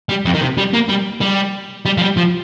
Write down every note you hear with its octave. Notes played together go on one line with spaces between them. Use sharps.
G3
F2
D#3
C3
G3
A#3
G3
G3
G3
F3
G3
F3